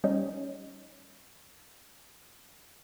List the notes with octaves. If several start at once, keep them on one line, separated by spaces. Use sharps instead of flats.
G3 C#4 D#4